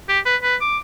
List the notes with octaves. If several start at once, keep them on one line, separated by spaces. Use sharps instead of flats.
G4
B4
B4
D6